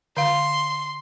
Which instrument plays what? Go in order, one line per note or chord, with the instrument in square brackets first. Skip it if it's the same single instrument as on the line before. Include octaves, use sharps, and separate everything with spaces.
[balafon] D3 F5 [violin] C6